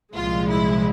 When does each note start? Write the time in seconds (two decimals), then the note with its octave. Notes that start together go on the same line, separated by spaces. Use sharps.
0.14 C2 A#2 F3 G#3 F4
0.50 E4